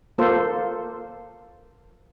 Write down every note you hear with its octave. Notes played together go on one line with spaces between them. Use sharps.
A#3 F4 A4 C5